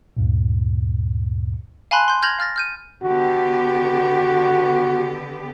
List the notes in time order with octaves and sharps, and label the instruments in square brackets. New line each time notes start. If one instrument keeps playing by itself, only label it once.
[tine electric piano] D2 G2 A#2
[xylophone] F5 G#5 A5 B5 C6 F#6
C6 G6
F6 G6 G#6 A#6 F7 F#7
F5 F6 A6 A#6
F6 G6 D#7
[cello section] D3 B3 G4 [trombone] F#4